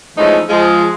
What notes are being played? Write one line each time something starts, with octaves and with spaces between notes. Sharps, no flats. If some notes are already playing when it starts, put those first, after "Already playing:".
E3 F3 G#3 A3 C#4 D#4
F3 G#3